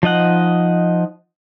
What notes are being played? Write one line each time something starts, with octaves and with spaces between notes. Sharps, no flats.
F3 D#4 D#5 F#5